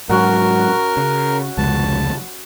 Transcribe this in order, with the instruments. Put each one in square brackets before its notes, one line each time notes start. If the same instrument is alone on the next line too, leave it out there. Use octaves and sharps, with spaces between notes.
[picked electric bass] G#2 F#3 [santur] C#4 F#4 F#5 [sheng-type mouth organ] A#4
[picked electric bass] C#3
[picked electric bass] F1 C#2 G#3 [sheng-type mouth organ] A5